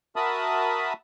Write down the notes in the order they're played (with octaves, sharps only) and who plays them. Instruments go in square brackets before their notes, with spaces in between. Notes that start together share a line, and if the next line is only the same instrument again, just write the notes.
[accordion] F#4 A#4 E5 A5 B5 D#6